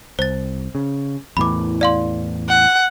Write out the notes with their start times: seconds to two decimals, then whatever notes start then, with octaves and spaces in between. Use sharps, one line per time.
0.19 C2 C5 A6
0.75 C#3
1.37 E2 A2 E3 B5 D6
1.81 D5 F5 C6
2.49 F#5